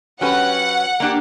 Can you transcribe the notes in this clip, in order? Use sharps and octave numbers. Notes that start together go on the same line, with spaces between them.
F#3 C#4 G4 B4 F#5
A#3 D4 G4